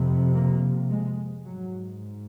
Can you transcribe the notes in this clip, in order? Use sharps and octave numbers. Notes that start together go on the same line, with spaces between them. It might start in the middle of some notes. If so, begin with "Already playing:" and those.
Already playing: F2 C3
A#3
G#3
G#2 F#3